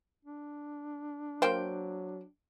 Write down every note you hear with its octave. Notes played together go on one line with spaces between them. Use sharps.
D4
F#3 A#3 C5 F5 G5